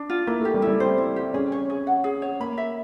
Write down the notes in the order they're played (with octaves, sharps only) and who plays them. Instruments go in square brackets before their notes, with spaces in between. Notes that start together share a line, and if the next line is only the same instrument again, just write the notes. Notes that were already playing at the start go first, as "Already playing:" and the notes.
Already playing: [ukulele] D4
F4
[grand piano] A#3 [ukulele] E4
[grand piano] A3
[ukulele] G4
[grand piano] G3
[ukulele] E4
[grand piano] G3
[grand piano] C4 [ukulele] C5
[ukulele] E4
G4
[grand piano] C#4 [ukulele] G#4
[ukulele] C#5
G#4
F#5
G#4
C#5
[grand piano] A#3 [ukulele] B5
[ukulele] E5